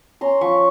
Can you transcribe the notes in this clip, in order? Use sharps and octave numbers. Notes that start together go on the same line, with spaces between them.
C#4 A#5 C6
F3 B5 C#6